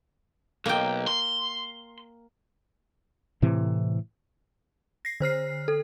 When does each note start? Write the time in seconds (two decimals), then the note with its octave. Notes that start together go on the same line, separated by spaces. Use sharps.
0.66 B1 A#3 G5
1.08 C6
3.42 A2 C3 E3 C4
5.05 A#6 C7
5.20 D3 C5 F6 C7
5.68 A4